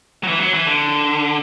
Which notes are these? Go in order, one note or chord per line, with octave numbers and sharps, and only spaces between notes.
F#3
E3
F#3
E3
D3